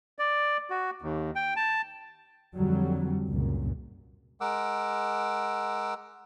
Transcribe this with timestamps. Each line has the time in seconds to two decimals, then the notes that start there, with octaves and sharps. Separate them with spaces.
0.19 D5
0.70 F#4
1.02 D#2
1.36 G5
1.56 A5
2.55 F2 D3 F#3 G3
3.29 C#2 F#2 A#2
4.41 G#3 A#4 F#5 D6 E6